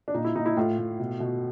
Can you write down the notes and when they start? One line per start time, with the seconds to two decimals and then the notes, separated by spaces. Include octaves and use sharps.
0.08 D4
0.14 A#2 D#4
0.25 E4
0.35 A#2 D#4
0.46 E4
0.57 A2 F4
0.78 A2
1.00 B2
1.20 B2